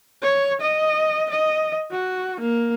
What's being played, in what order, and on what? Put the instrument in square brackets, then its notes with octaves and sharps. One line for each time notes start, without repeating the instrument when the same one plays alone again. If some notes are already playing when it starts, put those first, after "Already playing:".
[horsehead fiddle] C#5
D#5
D#5
F#4
A#3